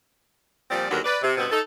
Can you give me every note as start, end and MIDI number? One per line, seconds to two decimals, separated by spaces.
0.71 0.89 46
0.71 0.89 53
0.71 0.89 55
0.71 0.89 60
0.71 0.89 74
0.91 1.00 39
0.91 1.00 50
0.91 1.00 54
0.91 1.00 59
0.91 1.00 70
1.05 1.19 71
1.05 1.19 74
1.22 1.34 48
1.38 1.47 43
1.38 1.47 47
1.38 1.47 59
1.38 1.47 60
1.52 1.60 63
1.52 1.60 69